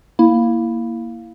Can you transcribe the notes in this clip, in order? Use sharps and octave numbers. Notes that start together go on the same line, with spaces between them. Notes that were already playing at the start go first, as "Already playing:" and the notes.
A#3 E4